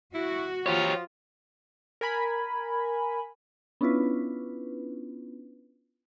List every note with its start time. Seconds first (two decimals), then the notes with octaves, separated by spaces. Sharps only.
0.14 E4 F#4
0.66 F3 F4 G4 C#5
2.01 A#4 G#5 B5
3.81 B3 C#4 D4 E4 F4 B4